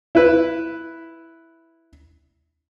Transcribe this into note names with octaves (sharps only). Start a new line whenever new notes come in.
E4 B4